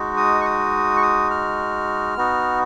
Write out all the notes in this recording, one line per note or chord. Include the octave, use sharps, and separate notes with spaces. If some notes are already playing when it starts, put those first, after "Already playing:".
Already playing: G#3 D#4 F#4
D#6
C#6
D#6
C#6
D#6
F6
B3 D#4 F#4